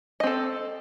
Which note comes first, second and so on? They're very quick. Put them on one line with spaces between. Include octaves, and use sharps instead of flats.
D#5 C4 A4